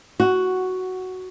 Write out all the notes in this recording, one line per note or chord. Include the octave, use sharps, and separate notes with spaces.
F#4